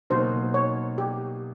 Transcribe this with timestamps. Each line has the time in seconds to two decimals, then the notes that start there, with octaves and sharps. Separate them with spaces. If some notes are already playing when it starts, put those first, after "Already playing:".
0.10 B2 F#3 A#3 D#4 C5
0.54 C#5
0.98 G4